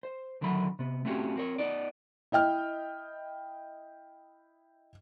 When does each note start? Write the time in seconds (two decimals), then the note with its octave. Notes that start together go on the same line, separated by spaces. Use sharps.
0.03 C5
0.41 D2 D3 D#3 F#3 B5
0.79 C3 B3
1.05 A3 C4 C#4 F#4 G4
1.36 C4 A#4 C#5
1.58 B3 D#4 D5
2.32 E4 D#5 G5 F6